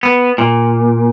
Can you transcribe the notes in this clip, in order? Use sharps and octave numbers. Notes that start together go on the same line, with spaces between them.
B3
A#2